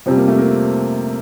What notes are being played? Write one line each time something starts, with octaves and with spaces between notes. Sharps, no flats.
F2 C3 G3 C4
A#3
A3
A#3